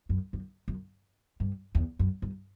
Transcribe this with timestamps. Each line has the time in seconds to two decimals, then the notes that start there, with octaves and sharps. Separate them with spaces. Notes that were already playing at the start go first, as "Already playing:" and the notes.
0.09 F#2
0.33 F#2
0.68 F#2
1.40 G2
1.75 E2
1.99 F#2
2.22 G2